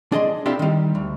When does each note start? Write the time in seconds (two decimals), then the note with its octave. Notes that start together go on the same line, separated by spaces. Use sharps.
0.12 D4 G#4 D#5 C6
0.46 C4 D4 E4 F4 G4 A4
0.59 D#3 G3
0.95 D2